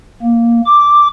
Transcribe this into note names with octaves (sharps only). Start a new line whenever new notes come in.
A#3
D6